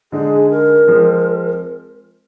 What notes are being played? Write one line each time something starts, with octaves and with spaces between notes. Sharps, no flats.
D3 G#3 D#4 G#4
A#4
F3 G#3 C4